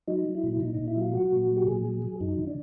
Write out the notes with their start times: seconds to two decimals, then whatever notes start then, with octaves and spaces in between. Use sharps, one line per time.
0.08 F#3 D#4
0.26 F#3
0.35 E4
0.44 A#2
0.53 E4
0.60 A#2 D#4
0.74 A#2 D#4
0.88 E4
0.96 F#3
1.01 F4
1.14 F#3 F#4
1.32 A#2
1.49 F#3
1.56 G4
1.68 A#2 G#4
1.85 F#3
2.02 F#3
2.20 F#2 D#4
2.38 D3
2.47 D4